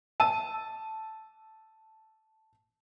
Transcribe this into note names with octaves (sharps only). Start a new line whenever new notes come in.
A5 E6 D#7